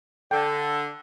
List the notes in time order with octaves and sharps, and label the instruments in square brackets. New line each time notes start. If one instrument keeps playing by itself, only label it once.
[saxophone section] D3 [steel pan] G5